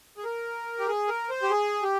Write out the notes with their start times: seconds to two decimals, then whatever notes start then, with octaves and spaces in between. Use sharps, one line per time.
0.17 G#4
0.24 A#4
0.79 G4
0.87 G#4
1.08 A#4
1.30 C5
1.43 G4
1.51 G#4
1.83 G4